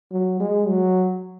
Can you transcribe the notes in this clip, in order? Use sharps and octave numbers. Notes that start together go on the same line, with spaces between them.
F#3
G#3
F#3